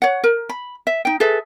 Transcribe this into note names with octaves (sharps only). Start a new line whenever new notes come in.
C#5 F#5
A#4
B5
E5
D#4 G5
G#4 A4 B4 E5